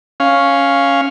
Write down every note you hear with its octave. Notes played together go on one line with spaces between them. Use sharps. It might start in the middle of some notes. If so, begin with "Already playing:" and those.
C#4 F5